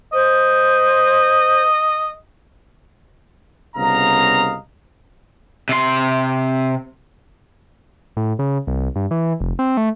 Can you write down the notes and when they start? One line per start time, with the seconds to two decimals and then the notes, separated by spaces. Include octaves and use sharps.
0.13 C5 D#5
3.75 C2 C#3 B3 D#5 F5 A#5
5.69 C3 C6
8.17 A2
8.39 C#3
8.67 C2
8.96 G2
9.11 E3
9.40 F1
9.59 C4
9.77 A3